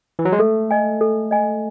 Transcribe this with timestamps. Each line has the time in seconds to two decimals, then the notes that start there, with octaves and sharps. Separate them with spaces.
0.19 E3
0.25 F#3
0.32 G#3
0.39 A3 A4
0.71 D#5 G#5
1.01 A4
1.31 D#5 G#5